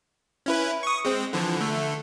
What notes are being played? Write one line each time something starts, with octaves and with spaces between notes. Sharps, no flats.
C#4 E4 B4
C#6 D#6
G#3 C4
D3 E3 F3
D3 A3